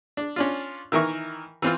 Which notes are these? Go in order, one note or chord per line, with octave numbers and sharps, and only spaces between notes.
D4
C#4 D4 F4
D#3 E3 A#4 E5 C#6 F6
E3 C4 F4